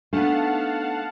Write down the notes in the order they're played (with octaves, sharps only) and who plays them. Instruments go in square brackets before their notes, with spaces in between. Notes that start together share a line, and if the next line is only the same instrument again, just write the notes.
[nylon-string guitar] A3 D#4 [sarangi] B3 [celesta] D4 [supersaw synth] F5 F#5 A5